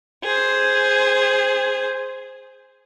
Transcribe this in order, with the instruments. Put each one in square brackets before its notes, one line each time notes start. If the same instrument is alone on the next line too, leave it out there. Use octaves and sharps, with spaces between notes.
[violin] G#4 C5